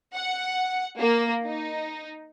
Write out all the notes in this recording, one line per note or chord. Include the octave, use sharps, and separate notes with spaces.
F#5
A#3
D#4